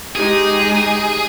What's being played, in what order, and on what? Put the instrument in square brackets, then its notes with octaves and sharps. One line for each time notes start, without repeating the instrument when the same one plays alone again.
[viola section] G#3 D#4 G4 [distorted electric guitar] G#4